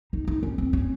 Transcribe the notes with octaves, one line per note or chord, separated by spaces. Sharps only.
D#4
D#4
C#4
C4
C#4